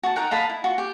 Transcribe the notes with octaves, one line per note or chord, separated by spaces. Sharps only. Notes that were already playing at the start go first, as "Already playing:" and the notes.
F#4 A5
D#4 A#4 F#5 G5
D#5 F5 A5 B5
E4
F4 F#4
G4